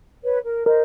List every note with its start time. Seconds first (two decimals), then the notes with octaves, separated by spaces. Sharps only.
0.24 B4 C#5
0.44 A#4
0.66 A#4 C5 D#5